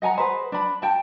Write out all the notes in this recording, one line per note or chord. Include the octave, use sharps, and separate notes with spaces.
D#5 F#5 G#5 A#5
G#4 B4 C5
D4 B5
G5 A5